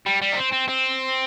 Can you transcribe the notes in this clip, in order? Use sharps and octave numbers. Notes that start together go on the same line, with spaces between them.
G3
G3
D#4
C4
C4
C4